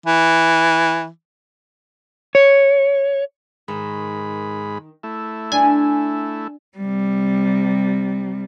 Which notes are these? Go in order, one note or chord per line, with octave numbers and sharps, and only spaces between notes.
E3
C#5
G#2 D#3 B5
A3 E4
D4 G#5
C3 G3